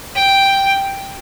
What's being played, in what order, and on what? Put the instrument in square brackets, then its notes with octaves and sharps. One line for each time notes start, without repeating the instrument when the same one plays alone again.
[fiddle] G5